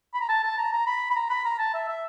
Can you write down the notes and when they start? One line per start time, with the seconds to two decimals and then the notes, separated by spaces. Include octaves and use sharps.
0.14 B5
0.21 A#5
0.29 A5
0.43 A5
0.58 A#5
0.73 A#5
0.87 B5
1.11 B5
1.16 A#5
1.30 B5
1.45 A#5
1.59 A5
1.74 E5
1.89 E5